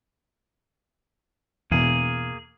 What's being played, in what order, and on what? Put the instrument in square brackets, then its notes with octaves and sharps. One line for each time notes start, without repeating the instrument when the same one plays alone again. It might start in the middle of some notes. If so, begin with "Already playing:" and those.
[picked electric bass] E2 B2 [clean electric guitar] A#3 G#4